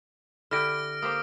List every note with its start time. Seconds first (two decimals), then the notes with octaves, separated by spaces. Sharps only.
0.51 D3 E4 G4 F6 A#6 D7
1.02 A#3 G4 C5 D#6